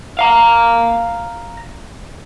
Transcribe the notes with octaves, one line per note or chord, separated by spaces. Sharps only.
F5 A#5